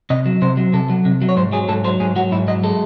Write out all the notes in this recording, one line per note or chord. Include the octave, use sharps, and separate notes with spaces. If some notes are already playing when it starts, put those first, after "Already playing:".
C3 D#5
F#3
C3 C5
F#3
C3 A4
F#3
C3
F#3
C#5
G#2 C5
F#3 G#4
G#2 A4
F#3 C5
G#2 G#4
F#3 F#4
G#2 E4
F#3 D#5
G#3 A4